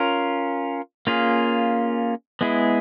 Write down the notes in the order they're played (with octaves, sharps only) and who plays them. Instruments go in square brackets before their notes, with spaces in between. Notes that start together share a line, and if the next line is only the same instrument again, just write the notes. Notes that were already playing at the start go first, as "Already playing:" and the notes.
Already playing: [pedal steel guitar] C#4 F4 A#4
A#3 C#4 F4 G#4
G#3 B3 E4 G#4